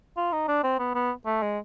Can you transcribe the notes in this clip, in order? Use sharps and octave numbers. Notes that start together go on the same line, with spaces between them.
F4
D#4
D4
C4
B3
B3
A3
G#3